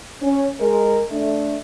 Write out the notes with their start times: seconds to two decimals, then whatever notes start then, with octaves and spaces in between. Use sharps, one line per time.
0.21 C#4
0.60 G#3 A#4
1.11 A3 D4